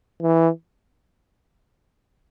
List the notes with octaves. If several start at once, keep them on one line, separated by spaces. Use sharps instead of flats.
E3